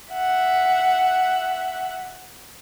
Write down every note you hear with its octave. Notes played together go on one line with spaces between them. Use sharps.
E5 F#5